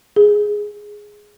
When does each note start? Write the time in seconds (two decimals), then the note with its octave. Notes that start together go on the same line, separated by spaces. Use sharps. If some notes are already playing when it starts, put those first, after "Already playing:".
0.16 G#4